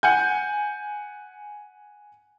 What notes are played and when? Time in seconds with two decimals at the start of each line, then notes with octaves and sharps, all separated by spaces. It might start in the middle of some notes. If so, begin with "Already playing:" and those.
0.03 F#5 G#5 G6